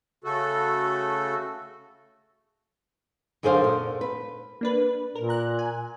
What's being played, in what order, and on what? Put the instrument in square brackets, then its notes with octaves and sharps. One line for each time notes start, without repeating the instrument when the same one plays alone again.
[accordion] C#3 A3 F#4 A4
[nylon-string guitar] F#2 D3 G#4 A#4 C5 F5
A#2
B4
[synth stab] A#3 D4 B4
[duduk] A#2 [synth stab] A#4
[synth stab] A#5 F#6
G#5